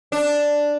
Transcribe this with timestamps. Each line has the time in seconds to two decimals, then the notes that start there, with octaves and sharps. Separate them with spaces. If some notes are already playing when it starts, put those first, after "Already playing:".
0.12 D4